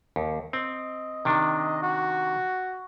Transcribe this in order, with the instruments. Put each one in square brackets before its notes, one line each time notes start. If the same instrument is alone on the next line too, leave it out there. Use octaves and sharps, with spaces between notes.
[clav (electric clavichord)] D#2
[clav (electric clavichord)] C4 [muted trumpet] D#5
[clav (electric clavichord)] C3 D#3 D4
[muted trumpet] F#4